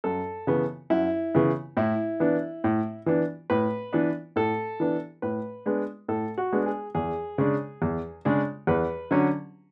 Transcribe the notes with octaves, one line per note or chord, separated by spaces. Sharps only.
F#2 A4
C#3 E3 B3
F#2 E4
C#3 E3 B3
A2 E4
E3 B3 D4
A2
E3 B3 D4
A2 B4
E3 B3 D4
A2 A4
E3 B3 D4
A2 B4
G#3 B3 D4
A2 A4
F#4
G#3 B3 D4
G#4
E2 G#4
C#3 G#3 D4
E2
C#3 G#3 D4
E2 B4
D3 F#3 C#4